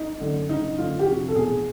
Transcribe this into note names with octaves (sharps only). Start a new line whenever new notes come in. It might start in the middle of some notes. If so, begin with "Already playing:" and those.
Already playing: D#4
F#2 D3
F#1 D#4
F#2 D3 F4
G4
F1 F#4
A4
E2 B2 G#4